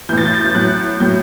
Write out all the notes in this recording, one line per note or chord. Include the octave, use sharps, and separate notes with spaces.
A2 E3 G6 A6
G6
A6
G6
A2 F#3 F#6
A2 F#3 G6